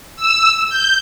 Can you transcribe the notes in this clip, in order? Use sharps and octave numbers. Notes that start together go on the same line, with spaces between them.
E6
G6